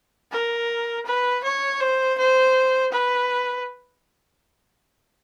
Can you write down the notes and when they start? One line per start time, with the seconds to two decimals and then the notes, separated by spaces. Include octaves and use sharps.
0.31 A#4
1.06 B4
1.43 C#5
1.80 C5
2.18 C5
2.92 B4